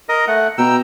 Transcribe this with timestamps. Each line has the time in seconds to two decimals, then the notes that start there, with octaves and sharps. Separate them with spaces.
0.09 A#4 D#5
0.27 A3 F#5
0.58 B2 G5 A#5 E6